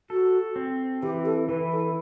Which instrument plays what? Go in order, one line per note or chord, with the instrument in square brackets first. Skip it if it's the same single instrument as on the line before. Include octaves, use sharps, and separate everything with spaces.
[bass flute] F#4 [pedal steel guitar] A4
[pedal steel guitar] C4
[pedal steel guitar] E3 [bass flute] G4
[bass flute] A4
[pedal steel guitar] E3 [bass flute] B4
[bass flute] A4